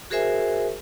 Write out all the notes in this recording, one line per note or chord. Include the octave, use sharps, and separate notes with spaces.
F#4 G#4 A#4 C5 E5 G#5